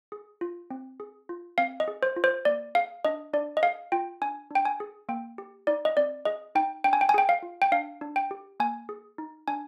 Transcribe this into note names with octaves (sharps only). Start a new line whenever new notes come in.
G#4
F4
C4
G#4
F4
C4 F5
D#5
G#4
C5
F4
C5
A#3 D5
G#4 F5
D4 D#5
D4 D5
D#5
G#4 F5
F4 G5
D4 G#5
D4 G5
G#5
G#4
A#3 G5
G4
D#4 D5
D#5
C4 D5
G#4 D#5
D#4 G5
D4 G5
G#5
G5
G#5
G#4 G5
F5
F4
G5
D4 F5
D4
G5
G4
A#3 G#5
G#4
D#4
D4 G#5